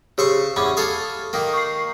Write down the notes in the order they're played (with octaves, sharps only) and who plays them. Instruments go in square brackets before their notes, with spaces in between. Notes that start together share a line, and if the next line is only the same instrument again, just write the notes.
[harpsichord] C#3 C5 C#6 [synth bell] G4
[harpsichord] E2 C#4 [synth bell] B5 C#6 D6
[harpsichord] A4 F5 G#5 [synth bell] D#6
[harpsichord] D#3 A#3
[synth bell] C#6 C7